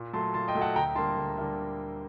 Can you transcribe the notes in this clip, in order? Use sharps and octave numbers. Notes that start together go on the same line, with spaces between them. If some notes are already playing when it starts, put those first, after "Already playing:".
Already playing: A#2
F#3 A3 A5 C6
A#2 A5 C6
D#5 G5
F#3 A3
F#5 A5
D2 G5 A#5
D3 G3 A#3 A5 C6
D2
D3 G3 A#3